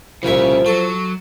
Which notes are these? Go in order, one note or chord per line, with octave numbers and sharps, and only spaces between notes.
C2 A#2 C#3 F3 E5
F#3 A4